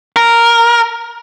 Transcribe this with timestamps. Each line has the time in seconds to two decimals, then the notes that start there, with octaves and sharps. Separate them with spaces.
0.16 A#4